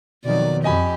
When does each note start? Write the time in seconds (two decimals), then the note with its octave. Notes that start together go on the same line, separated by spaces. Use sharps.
0.24 F2 B2 D#3 F#3 D5
0.64 F2 G4 D#5 G#5 B5